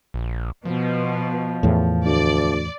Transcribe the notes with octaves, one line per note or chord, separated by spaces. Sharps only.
A#1
B2 F3
E2 A2
D2 D5